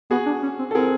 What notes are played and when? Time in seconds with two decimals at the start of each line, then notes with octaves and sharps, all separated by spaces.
0.11 B3 F#4 G#4
0.26 D4
0.43 C#4
0.59 C4
0.71 A4
0.75 C4 G#4 A#4